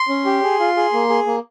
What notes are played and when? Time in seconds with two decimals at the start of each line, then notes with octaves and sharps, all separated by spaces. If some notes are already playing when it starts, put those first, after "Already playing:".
Already playing: C6
0.09 C#4
0.25 G4
0.43 G#4
0.60 F4
0.77 G#4
0.93 A#3
1.09 G#4
1.26 A#3